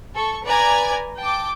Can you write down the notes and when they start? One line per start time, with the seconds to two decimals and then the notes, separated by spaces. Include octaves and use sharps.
0.15 A4 C#6
0.45 B4 D5 G#5 A#5 G#6
1.19 G5 A5 D6